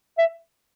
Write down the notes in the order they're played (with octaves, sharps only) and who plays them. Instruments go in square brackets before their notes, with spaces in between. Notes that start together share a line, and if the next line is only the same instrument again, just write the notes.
[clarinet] E5